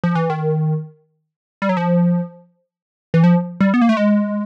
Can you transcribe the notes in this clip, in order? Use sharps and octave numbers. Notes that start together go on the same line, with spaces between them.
F3
E3
D#3
G3
F#3
F3
E3
F3
G3
B3
A#3
A3
G#3